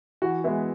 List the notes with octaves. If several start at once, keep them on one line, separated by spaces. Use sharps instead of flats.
E3 F#4
G#3 B3 E4